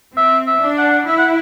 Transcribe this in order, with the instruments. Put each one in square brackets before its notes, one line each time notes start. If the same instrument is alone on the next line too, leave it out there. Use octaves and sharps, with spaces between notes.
[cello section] C4 [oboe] E5
[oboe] E5
[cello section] D4
[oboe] F#5
[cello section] E4 [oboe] E5
[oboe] F#5